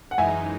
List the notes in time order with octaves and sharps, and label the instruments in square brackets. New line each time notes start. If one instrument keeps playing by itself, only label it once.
[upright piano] F#5
[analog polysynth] F#2 E3 G#3 D#4 [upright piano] E5 G#5